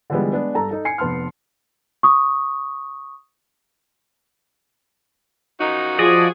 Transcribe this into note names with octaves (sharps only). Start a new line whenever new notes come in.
D3 E3 F3 G3 G#3 B3
G#3 B3 D4
G2 A4 A5 A#5
D#4 A4
G#5 C7 C#7
F1 B3 A5 C6 F6
C#6 D#6
F#2 F3 D#4 F#4
F3 G#4 D5 D#5